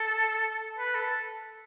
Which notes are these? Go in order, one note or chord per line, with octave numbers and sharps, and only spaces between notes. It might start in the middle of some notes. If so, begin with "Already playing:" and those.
Already playing: A4
B4
A4